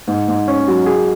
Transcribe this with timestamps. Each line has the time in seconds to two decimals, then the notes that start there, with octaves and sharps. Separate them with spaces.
0.08 G#2
0.28 G#2
0.48 C#4
0.67 F#3
0.86 G#4